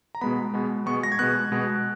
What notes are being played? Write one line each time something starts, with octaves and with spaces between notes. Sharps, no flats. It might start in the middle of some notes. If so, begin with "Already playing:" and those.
A#5
B2 G#3 B3 B5
B2 G#3 B3
B2 G#3 B3 C#6
A#6
G#6
B2 G#3 B3 F#6
B2 G#3 B3